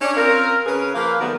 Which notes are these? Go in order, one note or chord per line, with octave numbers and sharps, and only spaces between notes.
C#4 D4
C4 C#4 F4 A#4
C#3 C#4 G#4 A#4 B4
F3 A#3 A#4 B4 F5
D#3 F#3 G3 A3 B3 A#4